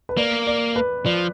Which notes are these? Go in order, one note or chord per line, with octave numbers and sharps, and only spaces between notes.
B4
A#3 D5
D5
B4
F3 D5